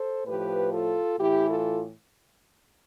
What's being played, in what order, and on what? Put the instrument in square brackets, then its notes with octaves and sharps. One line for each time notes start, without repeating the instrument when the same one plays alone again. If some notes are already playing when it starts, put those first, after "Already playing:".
Already playing: [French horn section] A4 C5
A2 F3 G4 B4
F4 A4
A2 E3 E4 G4
F4 A4